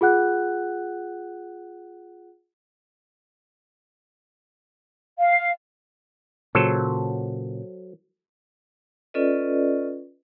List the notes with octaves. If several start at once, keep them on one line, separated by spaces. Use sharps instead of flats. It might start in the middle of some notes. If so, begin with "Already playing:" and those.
F4 G#4 F#5 F#6
F5
A#2 C#3 F#3 A4 C5
C#4 F4 A4 B4 D5 D#5